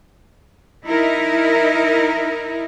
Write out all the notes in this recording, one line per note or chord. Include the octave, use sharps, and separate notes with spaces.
D#4 E4 A#4